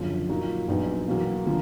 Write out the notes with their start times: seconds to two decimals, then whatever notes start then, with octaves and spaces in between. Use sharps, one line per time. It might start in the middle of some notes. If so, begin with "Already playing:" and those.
Already playing: F#1 F#2 D3 F3
0.28 A#2 F#3 A#3 D#4 F#4
0.68 A#1 A#2 F#3 B3 D#4
1.07 E2 B2 F#3 A#3
1.46 D3 F3 A#3